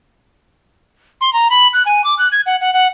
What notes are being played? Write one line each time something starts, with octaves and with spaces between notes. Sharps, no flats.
C6
A#5
B5
F#6
G#5
D6
F#6
G#6
F#5
F#5
F#5